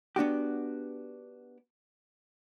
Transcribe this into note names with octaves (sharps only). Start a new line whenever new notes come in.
B3 D4 F#4 G4